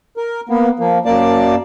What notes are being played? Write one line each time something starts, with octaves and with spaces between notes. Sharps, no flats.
A#4
A#3 B3
F3 A#3
F#2 A#3 D5 A5